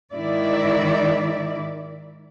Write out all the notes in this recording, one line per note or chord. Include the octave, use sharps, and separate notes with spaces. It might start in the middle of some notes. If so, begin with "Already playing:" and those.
G#2 D#3 E4 D5